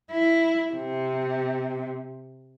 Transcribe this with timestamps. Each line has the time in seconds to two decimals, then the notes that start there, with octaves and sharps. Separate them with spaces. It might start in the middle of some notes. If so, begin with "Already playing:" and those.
0.11 E4
0.73 C3